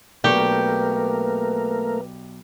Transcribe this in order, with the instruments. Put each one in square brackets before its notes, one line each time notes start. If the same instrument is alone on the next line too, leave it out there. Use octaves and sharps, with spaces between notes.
[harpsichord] B1 D4 C#6 [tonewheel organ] A3 A#3 A#4 [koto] G4 [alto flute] B4